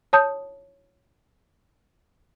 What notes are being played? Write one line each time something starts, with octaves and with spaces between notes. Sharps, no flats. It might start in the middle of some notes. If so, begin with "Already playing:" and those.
C#5 A5 D#6 G6